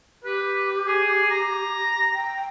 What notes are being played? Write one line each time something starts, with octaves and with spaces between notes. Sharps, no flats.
G4 B4
G#4
A#5
G5